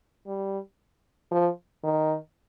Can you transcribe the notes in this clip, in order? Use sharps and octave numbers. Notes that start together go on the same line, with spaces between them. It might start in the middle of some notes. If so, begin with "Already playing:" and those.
G3
F3
D#3